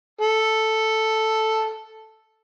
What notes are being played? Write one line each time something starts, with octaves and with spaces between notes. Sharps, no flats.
A4